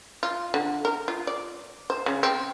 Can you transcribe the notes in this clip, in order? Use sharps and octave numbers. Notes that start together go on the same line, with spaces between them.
F4
D3
A#4
F4
D5
C5
C#3
C4